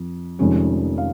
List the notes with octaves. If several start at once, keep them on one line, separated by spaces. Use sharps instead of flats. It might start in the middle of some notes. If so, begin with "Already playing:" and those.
Already playing: F2
F1 F2 D#3 G#3 C#4
F5